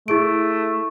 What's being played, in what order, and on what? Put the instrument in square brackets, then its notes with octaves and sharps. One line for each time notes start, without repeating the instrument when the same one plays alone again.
[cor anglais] A3 [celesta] E4 G#4 D7